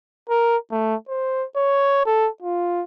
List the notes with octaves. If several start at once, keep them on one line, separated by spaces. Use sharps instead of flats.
A#4
A3
C5
C#5
A4
F4